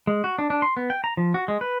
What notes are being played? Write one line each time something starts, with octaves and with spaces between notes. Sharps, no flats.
G#3
F#4
D4
D4
C6
B3
G5
A#5
F3
F#4
G#3
B4